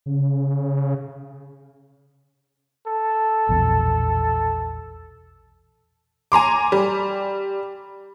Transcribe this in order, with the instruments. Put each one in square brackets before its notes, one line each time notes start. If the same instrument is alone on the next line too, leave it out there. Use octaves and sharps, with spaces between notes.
[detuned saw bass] C#3
[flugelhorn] A4
[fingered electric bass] A#1 E2 B2
[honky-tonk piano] G#5 A#5 C6 D6
G3